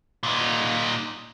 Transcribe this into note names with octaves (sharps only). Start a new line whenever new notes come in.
A#2 D#4